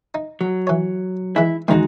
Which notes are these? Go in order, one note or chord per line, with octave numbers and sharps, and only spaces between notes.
D#4
F#3
E3 C#5
E3 G#3 E4 E5
E2 G#2 D#3 G#3 D#4 F#4